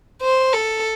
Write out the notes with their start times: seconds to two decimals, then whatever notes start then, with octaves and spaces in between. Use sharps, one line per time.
0.22 C5
0.53 A4